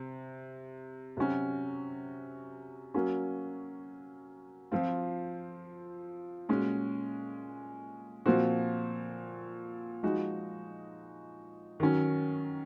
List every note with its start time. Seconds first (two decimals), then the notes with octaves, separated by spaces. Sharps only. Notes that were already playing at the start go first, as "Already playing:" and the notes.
Already playing: C3
1.17 C3 F#3 C#4 F#4
2.94 F#3 A#3 C#4
4.72 F3 C4 F4
6.49 A#2 G#3 C#4 F#4
8.26 A#2 F3 C4 F#4
10.03 F3 G#3 D#4 F#4
11.80 D#3 F#3 C#4